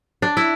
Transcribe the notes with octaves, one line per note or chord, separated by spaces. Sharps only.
D4
E4